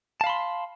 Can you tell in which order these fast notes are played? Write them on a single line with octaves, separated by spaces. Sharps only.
A5 F5 B5 C6